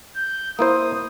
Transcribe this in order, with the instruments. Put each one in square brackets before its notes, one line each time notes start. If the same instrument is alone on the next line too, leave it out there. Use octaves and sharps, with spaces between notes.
[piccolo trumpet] G6
[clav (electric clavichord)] A#3 E4 C5 [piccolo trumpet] D#6